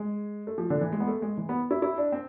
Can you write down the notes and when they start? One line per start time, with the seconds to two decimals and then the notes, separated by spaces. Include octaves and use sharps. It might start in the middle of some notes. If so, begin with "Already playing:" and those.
Already playing: G#3
0.47 A3
0.58 F3
0.70 D3
0.81 E3
0.92 G#3
1.00 B3
1.07 A3
1.22 G#3
1.37 E3
1.49 B3
1.71 E4
1.82 E4
1.98 D4
2.12 C4